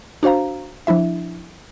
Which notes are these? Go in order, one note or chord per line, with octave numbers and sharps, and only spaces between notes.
D4 F#4 C5 F5 A#5
F3 D4 E4 E5